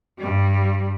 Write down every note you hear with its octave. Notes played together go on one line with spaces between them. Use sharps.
G2 G3